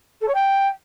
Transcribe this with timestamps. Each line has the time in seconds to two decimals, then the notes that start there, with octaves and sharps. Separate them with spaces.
0.21 A4
0.28 C#5
0.34 G5